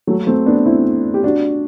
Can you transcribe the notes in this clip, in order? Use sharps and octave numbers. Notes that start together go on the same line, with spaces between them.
F#3 A3
A3 C4
B3 D4
C4 E4
G4
D4 F#4